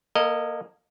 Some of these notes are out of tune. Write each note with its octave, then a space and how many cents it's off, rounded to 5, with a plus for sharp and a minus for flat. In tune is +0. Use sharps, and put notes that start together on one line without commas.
A#3 +15 A4 +45 D#5 -15